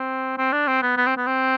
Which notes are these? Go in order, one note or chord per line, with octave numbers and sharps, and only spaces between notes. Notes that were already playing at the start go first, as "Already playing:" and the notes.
Already playing: C4
C4
D4
C4
B3
B3
C4
B3
C4